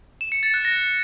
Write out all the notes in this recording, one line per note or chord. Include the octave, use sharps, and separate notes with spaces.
E7
C#7
A6
F#6
A#6